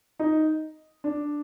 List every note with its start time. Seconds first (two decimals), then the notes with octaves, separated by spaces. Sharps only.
0.19 D#4
1.04 D4